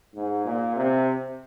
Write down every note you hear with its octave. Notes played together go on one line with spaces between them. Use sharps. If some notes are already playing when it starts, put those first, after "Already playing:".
G#2
A#2
C3